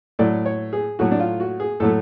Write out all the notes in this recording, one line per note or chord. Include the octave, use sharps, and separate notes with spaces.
A2 F#3 A3 D5
C#5
G#4
A2 F#3 A3 F#4
D4
F4
F#4
G#4
A2 F#3 A3 A4